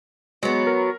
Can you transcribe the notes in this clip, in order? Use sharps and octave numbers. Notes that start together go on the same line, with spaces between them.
F#3 G#3 B3
A#4